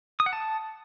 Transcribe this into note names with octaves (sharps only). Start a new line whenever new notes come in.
D#6
F#5
A5